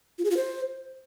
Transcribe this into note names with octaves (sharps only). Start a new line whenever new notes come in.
F4
G#4
F4
C5